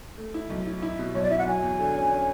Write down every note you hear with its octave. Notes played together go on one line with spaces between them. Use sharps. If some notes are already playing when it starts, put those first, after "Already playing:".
A3
E4
B1
E4
E4
B2
B1 C#5
D5
E4 E5
F#5
F#3 G#5
E2
D3
C#4
C#4